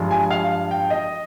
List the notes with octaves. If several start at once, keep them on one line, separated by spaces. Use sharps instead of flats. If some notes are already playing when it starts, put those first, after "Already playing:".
Already playing: G2 F3 G#3
G#5
F5
G5
D#5